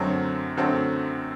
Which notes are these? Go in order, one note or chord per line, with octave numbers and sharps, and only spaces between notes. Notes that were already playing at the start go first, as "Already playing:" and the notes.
Already playing: F#2 D3 F#3 A3 C4
F#2 D3 F#3 A3 C4